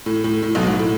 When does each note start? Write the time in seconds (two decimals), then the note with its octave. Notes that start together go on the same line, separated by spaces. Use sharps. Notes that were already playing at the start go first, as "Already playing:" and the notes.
0.06 A2
0.24 A2
0.43 A2
0.55 B1 B2
0.67 G#2
0.79 A2